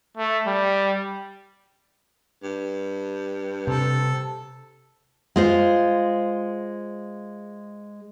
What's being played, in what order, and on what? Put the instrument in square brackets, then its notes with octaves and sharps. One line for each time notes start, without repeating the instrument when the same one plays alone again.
[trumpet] A3
G3
[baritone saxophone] G2
[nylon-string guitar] C3 [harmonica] A4
[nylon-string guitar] G#3 F4 C5